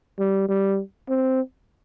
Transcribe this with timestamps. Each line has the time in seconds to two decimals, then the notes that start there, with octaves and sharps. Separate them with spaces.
0.19 G3
0.49 G3
1.09 C4